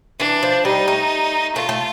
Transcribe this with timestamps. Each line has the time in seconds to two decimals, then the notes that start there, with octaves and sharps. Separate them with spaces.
0.20 E3 D4
0.43 F3
0.65 G3 D#4
0.88 A3
1.56 A3 F4
1.69 A3